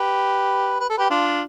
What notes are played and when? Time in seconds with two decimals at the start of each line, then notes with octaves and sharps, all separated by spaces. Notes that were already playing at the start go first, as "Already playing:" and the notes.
Already playing: G4 B4
0.80 B4
0.90 A4
0.98 G4 B4
1.10 D4 F4